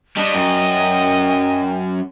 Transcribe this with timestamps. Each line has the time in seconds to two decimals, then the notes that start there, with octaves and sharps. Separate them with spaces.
0.17 G3 D4 D#5
0.34 F#2 G5